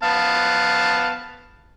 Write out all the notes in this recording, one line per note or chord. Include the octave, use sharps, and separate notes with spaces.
B3 F5 A5